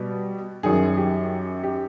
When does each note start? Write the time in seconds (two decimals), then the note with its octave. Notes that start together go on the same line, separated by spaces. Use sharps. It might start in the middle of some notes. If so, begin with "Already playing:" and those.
Already playing: B2 G3
0.63 F#2 D#3 F#3 G#4
0.97 G4
1.63 G4